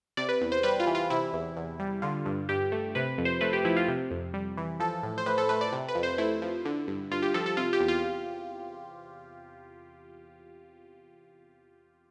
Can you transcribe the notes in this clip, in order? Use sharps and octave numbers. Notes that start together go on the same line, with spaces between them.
C3 D5
B4
E2
C5
G3 B4
F4
E3
F4
C3 E4
E2
E2
G3
D3 F4
G2
G2 G4
A3
C3 B4
F2
C5
A3 B4
G4
F3 E4
F4
C3
F2
G3
E3
F3 A4
A2
C5
A2 B4
A4
A3 B4
D5
C3
B4
F2
C5
A3 E4
F3
D3
G2
G2 F4
G4
F3 A4
A4
C3 F4
G4
E2
F4